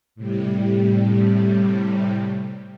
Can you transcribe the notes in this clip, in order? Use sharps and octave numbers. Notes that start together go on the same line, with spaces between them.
A2 C3 G3